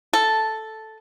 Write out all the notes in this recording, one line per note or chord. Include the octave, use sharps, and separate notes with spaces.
A4